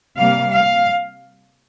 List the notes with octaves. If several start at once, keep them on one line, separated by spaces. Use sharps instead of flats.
C3 G3 A#3 F5
F5